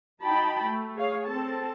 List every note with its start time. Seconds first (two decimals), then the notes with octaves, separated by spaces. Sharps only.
0.24 D#4 F#4 G5 A5 B5
0.64 A3
0.96 G#4 C#5 F5
1.27 C4 A4 A5